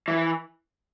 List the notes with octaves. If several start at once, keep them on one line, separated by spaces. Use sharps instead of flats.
E3